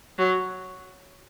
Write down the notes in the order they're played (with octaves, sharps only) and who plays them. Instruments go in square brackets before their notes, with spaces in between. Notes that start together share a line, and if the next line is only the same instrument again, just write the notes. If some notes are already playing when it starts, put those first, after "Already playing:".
[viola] F#3